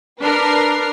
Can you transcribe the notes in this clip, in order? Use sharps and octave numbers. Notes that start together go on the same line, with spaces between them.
D4 A#4 B4 F6 C7